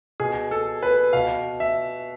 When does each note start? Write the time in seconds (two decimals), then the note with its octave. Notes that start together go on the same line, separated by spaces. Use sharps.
0.20 B2 G#4
0.51 A4
0.83 B4
1.13 B2 F5
1.60 E5